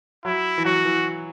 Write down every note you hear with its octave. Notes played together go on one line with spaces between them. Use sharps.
F#3 E4
E3
F#3 F#4
E3